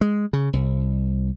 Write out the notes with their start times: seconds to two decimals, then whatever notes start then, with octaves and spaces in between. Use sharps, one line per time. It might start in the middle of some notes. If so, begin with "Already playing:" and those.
0.01 G#3
0.33 C#3
0.53 C2